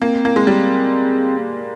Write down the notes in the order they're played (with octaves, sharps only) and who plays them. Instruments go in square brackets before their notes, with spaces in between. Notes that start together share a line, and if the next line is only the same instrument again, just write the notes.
[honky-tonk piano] A#3 [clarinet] C4
[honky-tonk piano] A#3
G#3
G3
[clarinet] A#3